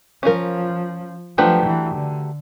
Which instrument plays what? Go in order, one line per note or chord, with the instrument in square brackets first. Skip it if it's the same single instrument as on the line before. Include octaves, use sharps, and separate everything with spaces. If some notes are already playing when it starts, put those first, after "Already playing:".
[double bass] F3 [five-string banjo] C#4 F4 A#4
[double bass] F3 [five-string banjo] F#3 A3 D4 G4 B4
[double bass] E3
D3